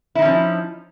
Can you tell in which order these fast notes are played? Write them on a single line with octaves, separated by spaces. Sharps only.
E4 D#4 C#4 F3